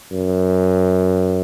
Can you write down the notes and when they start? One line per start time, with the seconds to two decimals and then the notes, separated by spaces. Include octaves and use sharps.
0.12 F#2